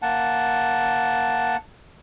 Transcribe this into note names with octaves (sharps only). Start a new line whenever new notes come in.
A#3 F#5 A5